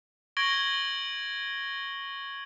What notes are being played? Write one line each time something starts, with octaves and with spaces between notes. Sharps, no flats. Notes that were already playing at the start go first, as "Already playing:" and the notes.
C#6 G#6 A#6 D7 F#7 G7